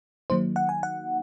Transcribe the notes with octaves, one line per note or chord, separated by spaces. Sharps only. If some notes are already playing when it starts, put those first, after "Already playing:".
D#3 F#3 A#3 D#4 C5
F#5
G#5
F#5